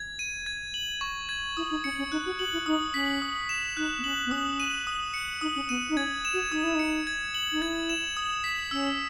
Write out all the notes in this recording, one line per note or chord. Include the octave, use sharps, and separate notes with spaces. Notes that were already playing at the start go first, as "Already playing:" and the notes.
Already playing: G#6
D#7
G#6
F#7
C#6
G#6
E4 D#6
D#4
C#4 C#7
C#4
D#4 F#6
F#4
F#4 F#7
E4
D#4 D#6
C#4 B6
D#6
E7
D#4 F#6
B3
C#4 F#7
B3
C#4 D#6
D#7
D#6
C#7
D#4 D#6
C#4
B3 D#7
D#4
C#4 G#6
E7
F#4
D#4 D#6
E4
D#4 C#7
G#6
F#7
D#4
E4 G#6
E7
D#6
B6
C#4 E6